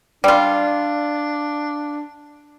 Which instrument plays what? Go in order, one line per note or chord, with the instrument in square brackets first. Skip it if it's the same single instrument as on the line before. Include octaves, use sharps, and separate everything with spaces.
[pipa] G3 F4 [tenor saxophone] D4